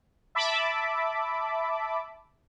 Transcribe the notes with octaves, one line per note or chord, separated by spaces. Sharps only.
E5 A5 B5 D6